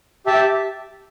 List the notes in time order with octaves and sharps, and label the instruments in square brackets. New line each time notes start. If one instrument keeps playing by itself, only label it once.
[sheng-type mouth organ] G4 E5 A5